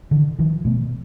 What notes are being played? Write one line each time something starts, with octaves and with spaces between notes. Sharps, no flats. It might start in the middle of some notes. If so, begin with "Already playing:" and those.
D3 E3
D#3 F3
B2 A3 B3